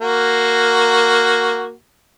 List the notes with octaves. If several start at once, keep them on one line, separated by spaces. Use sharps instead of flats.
A#3 F#4